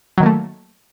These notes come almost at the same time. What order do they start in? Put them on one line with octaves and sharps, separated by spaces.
F#3 D#3 A#3 A3